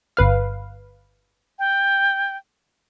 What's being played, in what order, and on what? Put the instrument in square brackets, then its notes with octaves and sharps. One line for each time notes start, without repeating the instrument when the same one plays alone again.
[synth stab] G1 B4 F5
[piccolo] G5